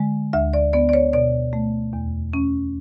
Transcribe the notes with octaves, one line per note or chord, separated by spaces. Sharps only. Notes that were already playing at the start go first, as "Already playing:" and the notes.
Already playing: D3 G#3
D2 E5
D5
B3 D5
D5
C#5
B2 D5
A3
E2
C#4